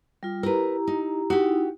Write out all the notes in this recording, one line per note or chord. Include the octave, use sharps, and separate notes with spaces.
G3 F4
E4 G4 A#4 B4 A#5
D#4
D#4 E4 F#4 G4